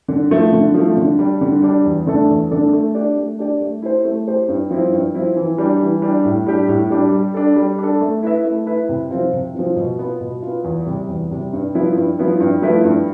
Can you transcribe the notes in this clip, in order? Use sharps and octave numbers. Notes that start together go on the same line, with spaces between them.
D3
F3 A3
D3
F3 A3
D3
G3 D4
D3
G3 D4
E2
D3 A3 D4 A4
E2
D3 A3 D4 A4
A3
D4 G4 D5
A3
D4 G4 D5
A3
E4 G4 C5
A3
E4 G4 C5
G2
F3 C4 E4
G2
F3 C4 E4
E3
G3 D4
E3
G3 D4
A2
G3 D4 G4
A2
G3 D4 G4
G3
D4 A4
G3
D4 A4
A3
E4 B4 E5
A3
E4 B4 E5
C3
F3 C4 F4
C3
F3 C4 F4
B2
B3 F4
B2
B3 F4
E2
C3 G3
E2
C3 G3
G2
F3 B3 E4
G2
F3 B3 E4
G2
F3 A3 E4 B4
G2